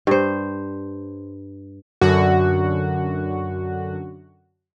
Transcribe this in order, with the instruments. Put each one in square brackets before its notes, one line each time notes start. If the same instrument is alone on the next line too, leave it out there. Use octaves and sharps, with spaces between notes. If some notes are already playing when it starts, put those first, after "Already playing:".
[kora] G2 C5
[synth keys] F#2 D3 F#4